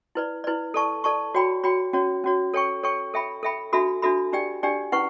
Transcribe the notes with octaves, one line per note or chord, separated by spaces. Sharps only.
E4 B4 D5
E4 B4 D5
A4 D5 A5 C#6
A4 D5 A5 C#6
F#4 C#5 G5 B5
F#4 C#5 G5 B5
C#4 F#4 C#5
C#4 F#4 C#5
A4 C#5 G5 C#6
A4 C#5 G5 C#6
A4 E5 G5 B5
A4 E5 G5 B5
D4 F#4 A4 E5 B5
D4 F#4 A4 E5 B5
D4 G4 D5 G5
D4 G4 D5 G5
C#4 E4 B4 F#5 C#6